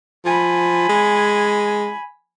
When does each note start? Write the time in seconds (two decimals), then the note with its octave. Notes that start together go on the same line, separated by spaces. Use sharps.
0.25 F3 G#5 B5
0.89 G#3